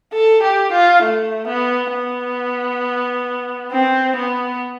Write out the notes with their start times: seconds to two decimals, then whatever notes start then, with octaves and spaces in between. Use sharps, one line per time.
0.13 A4
0.43 G4
0.72 F4
1.03 A3
1.48 B3
1.92 B3
3.72 C4
4.16 B3